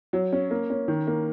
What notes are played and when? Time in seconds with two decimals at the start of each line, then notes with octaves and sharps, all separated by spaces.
0.13 F#3
0.32 C#4
0.51 A#3
0.70 C#4
0.88 D#3
1.07 A#3